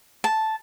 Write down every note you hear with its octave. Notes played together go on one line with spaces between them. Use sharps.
A5